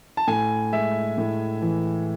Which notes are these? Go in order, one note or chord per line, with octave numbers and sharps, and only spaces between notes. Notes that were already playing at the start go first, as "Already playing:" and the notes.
A5
A2 G#5
G#3 E5
A2
E3